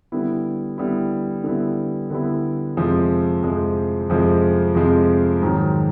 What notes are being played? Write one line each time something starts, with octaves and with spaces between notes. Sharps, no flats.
D3 G3 B3 E4
D3 G3 B3 E4
D3 G3 B3 E4
D3 G3 B3 E4
F2 C3 F3 G#3
F2 C3 F3 G#3
F2 C3 F3 G#3
F2 C3 F3 G#3
G#2 D#3 F#3